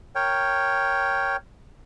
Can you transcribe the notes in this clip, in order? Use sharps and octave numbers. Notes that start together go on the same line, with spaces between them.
A#4 C#5 G5